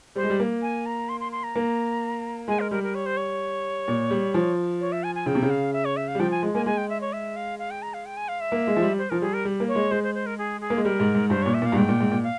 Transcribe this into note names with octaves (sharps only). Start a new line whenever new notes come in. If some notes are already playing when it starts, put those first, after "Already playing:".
G3 C5
G#3
G3
A#3
G#5
A#5
C6
C6
C6
A#5
A#3
G#3 G#5
A#4
G3 A#4
A#4
C#5
C5
C#5
A#2
G3
F3
C#5
E5
G#5
G#5
C#3 G5
C3
C#3
F5
E5
C#5
E5
F5
G3
F3 G5
G#5
G#3
A#3 G#5
G#3 G#5
G5
E5
C#5
E5
F5
F5
G5
A#5
F5
G5
G#5
F5
E5
A#3
G#3
F3
G3
C5
F3 A#4
G3 G#4
A#4
G3
A#3
C#5
G#3
G#3 C5
C5
C5
A#4
G#4
G#4
A#3
G#3
G3 A#4
G#2
G#2
G2 C5
A#2 C#5
E5
A#2 F5
G2
G#2 G5
A#2
G#2
A#2
F5